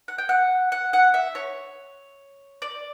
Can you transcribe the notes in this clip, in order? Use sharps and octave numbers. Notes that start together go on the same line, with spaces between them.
F#5
G5
F#5
F#5
F#5
E5
C#5
D5